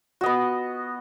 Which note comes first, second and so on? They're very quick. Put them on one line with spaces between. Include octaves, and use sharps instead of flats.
F#4 D#5 B3